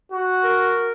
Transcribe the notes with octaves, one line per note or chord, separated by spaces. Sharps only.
F#4
A#4